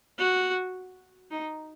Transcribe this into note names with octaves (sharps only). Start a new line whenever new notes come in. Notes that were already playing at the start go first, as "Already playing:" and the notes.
F#4
D#4